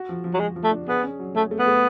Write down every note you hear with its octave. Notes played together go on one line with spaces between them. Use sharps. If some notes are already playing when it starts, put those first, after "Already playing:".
Already playing: F#4
F3
F3
F#3
F3 G#3
F3
A3
D4
B3 G#4
C#4
F#3
F#3 A3
A3
B3
A3